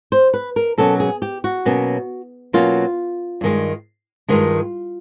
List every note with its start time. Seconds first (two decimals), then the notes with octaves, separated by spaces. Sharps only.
0.12 C5
0.34 B4
0.56 A#4
0.78 B2 F#3 A#3 C#4 A4
1.00 G#4
1.22 G4
1.44 F#4
1.65 B2 F#3 A#3 C#4
2.53 B2 F#3 A#3 C#4 F4
3.41 G2 D#3 G#3
4.29 G2 D#3 G#3 F4